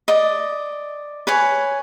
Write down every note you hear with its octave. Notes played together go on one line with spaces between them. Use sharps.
D5 D#5
B4 C#5 G#5